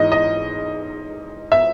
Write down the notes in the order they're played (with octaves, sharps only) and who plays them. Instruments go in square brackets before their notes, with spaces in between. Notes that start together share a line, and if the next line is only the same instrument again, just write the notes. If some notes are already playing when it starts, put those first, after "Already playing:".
Already playing: [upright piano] G#2 E3 D#5
D#5
E5